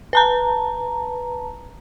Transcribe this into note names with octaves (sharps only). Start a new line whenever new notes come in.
B4 A5 A#5